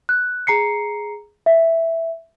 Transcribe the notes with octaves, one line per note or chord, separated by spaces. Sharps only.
F#6
G#4 A#5 C7 C#7
E5